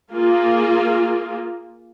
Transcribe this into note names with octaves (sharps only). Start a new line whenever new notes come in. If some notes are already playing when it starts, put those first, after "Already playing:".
A#3 F4 G#4